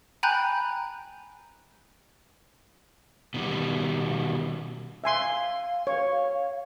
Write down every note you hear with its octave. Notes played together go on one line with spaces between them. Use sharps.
G5 G#5 A#5 B5 F#6 G6
B2 D#3 G3
E5 F5 G#5 C6
C#5